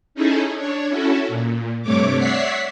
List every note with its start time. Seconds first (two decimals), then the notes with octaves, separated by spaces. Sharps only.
0.15 C#4 D#4 E4 G#4 A4
0.56 D4 C#5
0.88 C#4 E4 F#4 A4
1.28 A#2
1.82 G2 C3 A3 C#5 D6
2.18 C#5 D5 E5 F#5 B6 C7